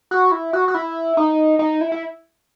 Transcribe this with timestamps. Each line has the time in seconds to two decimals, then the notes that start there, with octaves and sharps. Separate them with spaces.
0.11 F#4
0.32 E4
0.53 F#4
0.68 F#4
0.75 E4
1.17 D#4
1.59 D#4
1.81 E4
1.92 E4